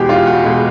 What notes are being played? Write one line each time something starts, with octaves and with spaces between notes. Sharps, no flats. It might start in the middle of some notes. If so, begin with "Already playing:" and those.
Already playing: E2 B2 G#3 G4 G#4
F4
F#4
B2 G#3